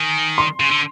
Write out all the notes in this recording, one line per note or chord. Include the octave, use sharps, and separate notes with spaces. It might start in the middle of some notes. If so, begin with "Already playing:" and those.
Already playing: D#3 G#5
C6
C#3
D3